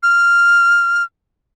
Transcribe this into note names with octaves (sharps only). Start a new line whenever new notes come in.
F6